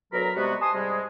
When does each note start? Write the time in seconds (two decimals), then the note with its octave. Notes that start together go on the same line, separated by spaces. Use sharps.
0.13 D2 B2 F#3 A#4 A#5 B5
0.36 C3 G3 G#3 B3 F#4
0.61 G#5 A5 C6 D#6
0.74 G#2 C3 G3 G#3